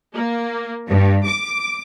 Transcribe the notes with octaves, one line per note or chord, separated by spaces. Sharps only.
A#3
G2
D6